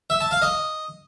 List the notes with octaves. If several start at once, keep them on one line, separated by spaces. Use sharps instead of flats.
E5
A5
F5
D#5